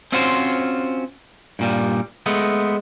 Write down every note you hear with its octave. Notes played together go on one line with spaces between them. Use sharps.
C4 C#4 F4 F#4 C5
G2 A#2 G3
G#3 A3 B3